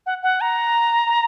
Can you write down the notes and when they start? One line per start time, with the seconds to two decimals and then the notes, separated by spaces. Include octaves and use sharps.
0.06 F#5
0.23 F#5
0.41 A#5